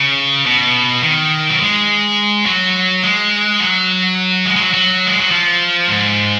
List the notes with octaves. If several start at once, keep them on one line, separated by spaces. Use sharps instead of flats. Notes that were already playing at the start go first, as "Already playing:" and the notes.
Already playing: C#3
B2
D#3
F#3
G#3
F#3
G#3
F#3
G#3
G#3
F#3
F#3
G#3
F#3
F3
G#2